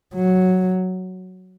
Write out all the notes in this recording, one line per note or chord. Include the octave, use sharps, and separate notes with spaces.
F#3